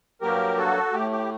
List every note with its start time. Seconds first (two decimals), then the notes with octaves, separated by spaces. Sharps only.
0.21 G2 F#3 A#3 G4 A#4
0.57 F#4 A4
0.93 A2 A3 G4
1.11 G4